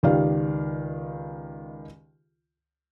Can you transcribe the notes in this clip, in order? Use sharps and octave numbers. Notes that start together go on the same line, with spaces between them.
C#2 D#3 G4 D5 F5